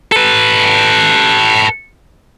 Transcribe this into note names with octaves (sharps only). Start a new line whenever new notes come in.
A4 B4